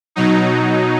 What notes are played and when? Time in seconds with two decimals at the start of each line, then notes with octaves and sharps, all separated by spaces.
0.16 B2 F#3 D#4